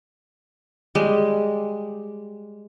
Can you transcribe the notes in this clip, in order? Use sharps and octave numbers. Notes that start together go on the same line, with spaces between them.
G3 G#3